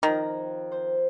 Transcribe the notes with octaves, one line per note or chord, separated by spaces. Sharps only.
F2 D#3 A#4 A#5
C5